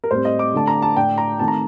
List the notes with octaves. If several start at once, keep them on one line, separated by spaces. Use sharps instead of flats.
A#4
A2 G3 C4 C5
D#5
D6
D3 A3 D4 A5
A#5
A5
A2 A3 D4 G5
A#5
D#3 A3 C4 A5
A#5